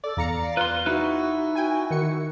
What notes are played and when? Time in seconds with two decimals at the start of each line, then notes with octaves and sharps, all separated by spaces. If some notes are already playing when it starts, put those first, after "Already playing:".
0.04 A4 D5
0.17 E2 F5 A#5 C#7
0.57 F4 B4 C6
0.86 D#4 E4 F#4 B4
1.55 F#4 G5 G#5
1.90 D#3 C#7